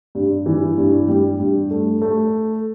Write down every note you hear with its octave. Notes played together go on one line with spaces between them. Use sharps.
G2
E3
G2
G3
G2
A3
A3